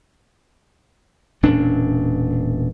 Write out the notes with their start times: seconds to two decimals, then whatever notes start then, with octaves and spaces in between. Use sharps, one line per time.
1.43 E1 A#2 C#4 D4